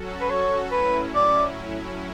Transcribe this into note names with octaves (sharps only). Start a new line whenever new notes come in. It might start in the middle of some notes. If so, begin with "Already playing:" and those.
Already playing: F#3 C#4 F#4 A4
B4
C#5
A2 F#3 C#4 E4 B4
D5